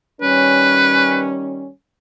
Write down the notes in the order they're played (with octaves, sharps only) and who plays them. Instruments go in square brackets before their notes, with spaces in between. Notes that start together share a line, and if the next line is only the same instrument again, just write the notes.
[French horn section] D#3 G3 C#4 [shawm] B4